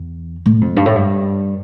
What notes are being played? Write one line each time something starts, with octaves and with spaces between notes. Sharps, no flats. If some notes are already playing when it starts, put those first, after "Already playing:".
Already playing: E2
A2
F2
G2
A2
G2